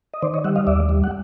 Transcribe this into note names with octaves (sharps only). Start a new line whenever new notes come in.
D#5
D#3 C5 D5
C#5 D#5
G3 E5 F#5
D#5 F5
D#2 D5 E5
G3
F#5